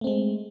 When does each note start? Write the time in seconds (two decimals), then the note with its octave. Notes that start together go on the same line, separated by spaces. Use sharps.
0.01 A3
0.04 C4
0.07 G#3